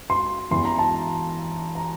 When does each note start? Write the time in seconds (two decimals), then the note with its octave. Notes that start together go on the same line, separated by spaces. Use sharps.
0.10 C6
0.51 E2 E3 C6
0.65 A#5
0.79 A5
1.75 A#5